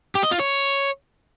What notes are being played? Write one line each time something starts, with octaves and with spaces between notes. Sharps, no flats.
G4
D#5
F4
C#5